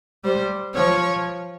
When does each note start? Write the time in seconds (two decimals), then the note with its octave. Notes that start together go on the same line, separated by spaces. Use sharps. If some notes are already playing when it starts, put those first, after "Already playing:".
0.24 G3 C5
0.74 F3 C#5